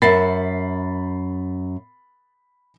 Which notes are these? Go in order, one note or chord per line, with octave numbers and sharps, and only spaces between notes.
F#2 A#4 E5 F#5 B5 A6 C7